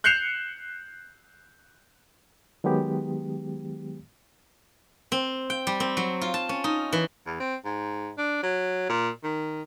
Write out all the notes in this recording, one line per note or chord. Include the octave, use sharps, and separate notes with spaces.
F#6 G6 C7 C#7 E7 F7
D#3 F#3 G#3 B3 G4
C4
G5
G3
C4
F#3
F4
A5
C#4
D#4
E3
E2
C4
G#2
D4
F#3
A#2
D#3